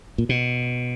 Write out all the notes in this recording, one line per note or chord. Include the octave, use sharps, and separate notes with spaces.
A#2
B2